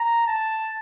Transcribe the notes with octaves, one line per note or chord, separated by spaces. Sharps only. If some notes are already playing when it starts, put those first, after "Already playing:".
Already playing: A#5
A5